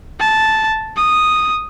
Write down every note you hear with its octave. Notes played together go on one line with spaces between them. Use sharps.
A5
D#6